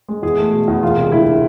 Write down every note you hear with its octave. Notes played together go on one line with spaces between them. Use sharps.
G#3
E2 G#4
A3
B2
E2
E1 F4
C3
D2 E4